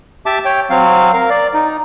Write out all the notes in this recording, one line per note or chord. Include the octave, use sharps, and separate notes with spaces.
G4 E5 A5 D6
C#5 G5
F#3 C4 F5
A#4 F5
D5
D#4